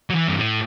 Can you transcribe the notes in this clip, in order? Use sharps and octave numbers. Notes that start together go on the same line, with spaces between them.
F#3
E3
G2
A2